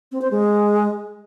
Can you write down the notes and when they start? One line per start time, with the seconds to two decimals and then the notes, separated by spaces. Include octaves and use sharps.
0.12 C4
0.22 C5
0.31 G#3